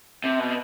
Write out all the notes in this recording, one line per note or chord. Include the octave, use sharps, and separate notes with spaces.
C3
B2